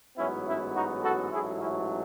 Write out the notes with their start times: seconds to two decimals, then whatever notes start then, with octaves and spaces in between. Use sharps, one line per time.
0.18 A1 G#2 F#3 B3 C#4 E4
0.47 C#4 E4
0.75 D#4 F#4
1.03 F#4 A4
1.31 A1 G#2 F#3 A3 E4 G#4
1.60 C#4 E4